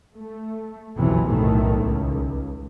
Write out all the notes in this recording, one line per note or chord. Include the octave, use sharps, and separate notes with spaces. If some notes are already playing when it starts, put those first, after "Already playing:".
A3
F#1 B1 F2 C3 E3
B1 F2 A2 D#3 A3
C#2